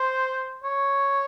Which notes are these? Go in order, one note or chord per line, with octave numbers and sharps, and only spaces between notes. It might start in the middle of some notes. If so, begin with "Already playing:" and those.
Already playing: C5
C#5